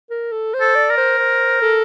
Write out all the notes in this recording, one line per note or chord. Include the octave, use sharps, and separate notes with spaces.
A#4
A4
C5
A4
D5
A#4
C5
C5
A4